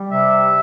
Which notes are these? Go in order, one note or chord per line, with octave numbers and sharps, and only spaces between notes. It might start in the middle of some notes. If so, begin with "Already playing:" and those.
Already playing: G3
C3 E5